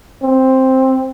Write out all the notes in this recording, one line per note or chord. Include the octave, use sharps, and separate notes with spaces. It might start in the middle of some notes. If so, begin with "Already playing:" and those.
C4